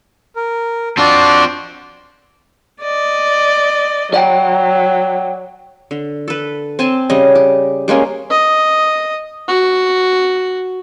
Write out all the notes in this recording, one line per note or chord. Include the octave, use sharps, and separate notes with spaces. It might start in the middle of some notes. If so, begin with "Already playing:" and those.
A#4
C4 D4 F4 F#4 A5
D5 D#5
F#3 D5 F#5 G5
D3
A4 B4
C4 G#5 A5 C6
C#3 G3 D#5
G4
G3 G#3 A#3 C#4
D#5
F#4